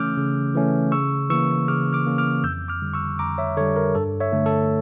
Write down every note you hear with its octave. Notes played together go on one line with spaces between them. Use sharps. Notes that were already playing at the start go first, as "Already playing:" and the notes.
Already playing: C#3 E3 A3 C#4 D6 E6 F6 G6
C#3
E3 A3 C#4
C#3 C#6 E6
E3 A#3 C#4 C#6 E6
C#3 D6 F6
D6 F6
E3 A#3 C#4
D6 F6
F2 E6 G6
D6 F6
D3 G3
C#6 E6
F2 A#5 D6
C#5 E5
D3 G3 A4 C#5
A#4
G2 A4
C#5 E5
D3 A3
A4